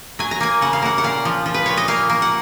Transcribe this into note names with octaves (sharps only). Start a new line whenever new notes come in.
F#3 G#5
A#5
A#3 G#5
C#3 F#5
F5
A#3 F#5
F#5
A#2 F5
F3
F3
B4
A#2 C#5
D#5
A#3 F5
A#3
F#5